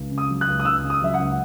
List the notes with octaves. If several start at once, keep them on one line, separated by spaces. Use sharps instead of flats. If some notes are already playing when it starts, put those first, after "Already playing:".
Already playing: C#2
C#3
D#6
F#3
F#6
C#2
D#6
C#2 E6
C#3
D#6
F#3 E5
F#5
C#2